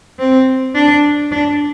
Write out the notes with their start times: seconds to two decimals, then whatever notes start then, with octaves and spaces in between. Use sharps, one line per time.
0.19 C4
0.75 D4
1.31 D4